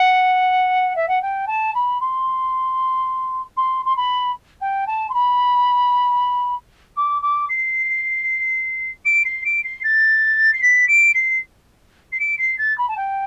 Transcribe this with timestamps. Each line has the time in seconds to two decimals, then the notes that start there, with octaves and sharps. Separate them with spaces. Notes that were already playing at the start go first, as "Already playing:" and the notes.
Already playing: F#5
0.95 E5
1.08 F#5
1.21 G5
1.47 A5
1.74 B5
2.00 C6
3.57 C6
3.85 C6
3.96 B5
4.61 G5
4.87 A5
5.09 C6
5.13 B5
6.96 D6
7.22 D6
7.49 C7
9.05 D7
9.25 C7
9.44 D7
9.64 C7
9.84 A6
10.53 C7
10.62 B6
10.88 D7
11.14 C7
12.12 C7
12.19 D7
12.39 C7
12.58 A6
12.77 B5
12.88 A5
12.97 G5